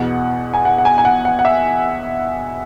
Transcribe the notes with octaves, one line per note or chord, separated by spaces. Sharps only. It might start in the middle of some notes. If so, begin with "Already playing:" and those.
Already playing: E2 B2 F#5
G#5
F#5
F#5
G#5
G#5
F#5
F#5
F#5
E5